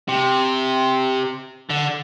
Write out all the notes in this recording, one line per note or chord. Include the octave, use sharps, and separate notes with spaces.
C3
D3